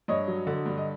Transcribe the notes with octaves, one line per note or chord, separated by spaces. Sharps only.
G2 C#5 D#5
F#3
D3
G2
D#5